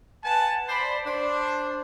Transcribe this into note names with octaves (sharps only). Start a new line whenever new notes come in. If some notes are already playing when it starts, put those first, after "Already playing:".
B4 F#5 G#5 A5
C5 D5 B5
D4 C5